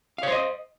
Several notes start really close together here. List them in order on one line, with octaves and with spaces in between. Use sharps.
F5 C#5 C5 D#5